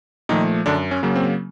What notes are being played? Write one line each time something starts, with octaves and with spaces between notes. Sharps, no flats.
A#2 D#3 F3 A3 D#4
F#2 D3 D4
C#4
C#3 F#3 A#3
C4